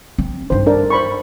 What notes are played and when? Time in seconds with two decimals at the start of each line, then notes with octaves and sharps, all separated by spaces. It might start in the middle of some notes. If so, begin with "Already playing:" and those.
0.18 C4
0.50 G2 D#4 C5
0.67 D4 A#4 D5
0.90 C5 B5 C#6